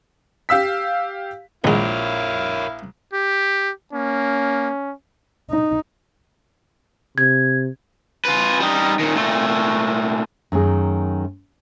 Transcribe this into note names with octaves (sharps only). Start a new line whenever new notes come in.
G4 F5 E6 B6
A#1 D#3 G#3 E4 A#4 C#5 F5
G4
A#3 C#4
D#4
C3 G#6
F4 B4
G3 D#4
A#2 D#3
A#2 A3
F#2 D#3 A3 G#4